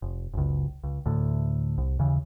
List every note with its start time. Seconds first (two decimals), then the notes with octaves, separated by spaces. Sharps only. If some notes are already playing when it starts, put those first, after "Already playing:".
0.02 F1
0.34 F#1 C#2
0.84 C#2
1.06 D2 A2
1.78 C2
1.99 D#2 C#3 E3